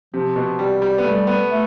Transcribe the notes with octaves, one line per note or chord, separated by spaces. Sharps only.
C3 F3
B2
G3
G3
B3
G3 A3
B3
A3